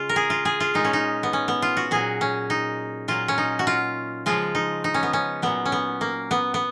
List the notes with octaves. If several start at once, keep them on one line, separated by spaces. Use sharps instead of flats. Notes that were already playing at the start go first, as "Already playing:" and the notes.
Already playing: C#3 G#3 F4
A#4
G#4
F4
G#4
F4
A#2 G#3 D#4
C#4
D#4
B3
C#4
B3
F4
F#4
A#2 F#3 G#4
C#4
D#4
A#2 F#3 F4
C#4
D#4
F#4
F4
C#3 F3 G#3 F4
D#4
D#4
C#4
B3
C#4
A#2 F#3 B3
C#4
B3
A#3
B3
B3